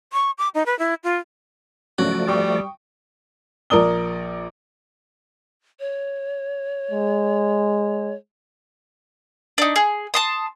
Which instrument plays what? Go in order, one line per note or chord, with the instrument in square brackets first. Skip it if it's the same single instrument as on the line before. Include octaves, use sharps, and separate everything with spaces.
[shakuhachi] C#6
D6
D#4
B4
E4
F4
[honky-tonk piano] C#3 F#3 [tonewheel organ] F3 A3 D5 [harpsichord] F#4
[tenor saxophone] G3 [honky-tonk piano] G5 C#6 D#6
[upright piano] A#1 A#4 D5 D#6 G7
[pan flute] C#5
[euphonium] G#3
[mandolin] D4 D#4
G#4
A5 C6 D#6